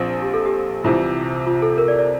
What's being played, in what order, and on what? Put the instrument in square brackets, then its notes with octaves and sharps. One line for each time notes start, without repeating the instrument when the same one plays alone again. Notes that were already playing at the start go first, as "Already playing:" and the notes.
Already playing: [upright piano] A#1 F3 C4
[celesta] G4
A4
G4
[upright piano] C2 C3 E3 [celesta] F4
[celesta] F4
A4
A#4
D5
D5